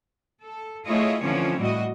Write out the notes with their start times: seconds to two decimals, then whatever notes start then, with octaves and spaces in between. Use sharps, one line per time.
0.43 A4
0.87 A3 E4 F4 G#4 C#5 D#5
1.22 D3 E3 F3 C4 C#4 C#5
1.59 A2 G3 F#4 D#5